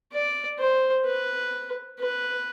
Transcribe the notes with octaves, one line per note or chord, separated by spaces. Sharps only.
D5
C5
B4
B4